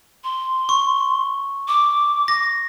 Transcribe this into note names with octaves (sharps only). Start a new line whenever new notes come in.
C6
C#6
D6
A#6